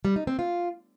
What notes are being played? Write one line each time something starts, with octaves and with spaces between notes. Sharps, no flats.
G3
D#4
C4
F4